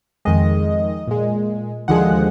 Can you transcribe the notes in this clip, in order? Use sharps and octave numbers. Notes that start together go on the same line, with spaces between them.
F2 D#3 G#3 D#5
A#2 G#3
D#2 D3 F3 G#3 F#5